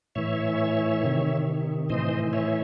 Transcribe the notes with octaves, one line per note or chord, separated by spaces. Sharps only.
A2 E3 C#5 E5
C3 D#3
A2 E3 C5 D#5
C#5 E5